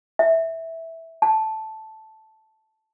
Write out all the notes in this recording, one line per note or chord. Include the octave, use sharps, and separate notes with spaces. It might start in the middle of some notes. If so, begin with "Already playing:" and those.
E5
A5